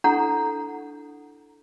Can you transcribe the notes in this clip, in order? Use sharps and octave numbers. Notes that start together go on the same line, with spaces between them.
D4 E4 A4 F#5 A#5